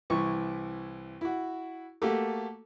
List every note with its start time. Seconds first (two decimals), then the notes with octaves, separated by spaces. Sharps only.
0.10 C2 E3 E4 C#6
1.21 E4 F#4
2.02 A3 A#3 F#4 G4 A4